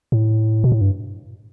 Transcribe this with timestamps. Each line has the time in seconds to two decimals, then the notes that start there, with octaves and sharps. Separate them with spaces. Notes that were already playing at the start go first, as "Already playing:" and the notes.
0.12 A2
0.64 B2
0.72 A2
0.81 G2